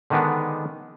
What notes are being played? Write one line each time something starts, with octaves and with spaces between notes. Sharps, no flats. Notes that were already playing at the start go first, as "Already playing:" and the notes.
D3 D#3 G#3 B3 D4